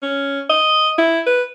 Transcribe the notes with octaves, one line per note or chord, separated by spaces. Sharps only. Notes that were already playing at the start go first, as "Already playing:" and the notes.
C#4
D#5
E4
B4